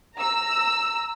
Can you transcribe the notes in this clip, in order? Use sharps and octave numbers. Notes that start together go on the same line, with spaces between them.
A#5 E6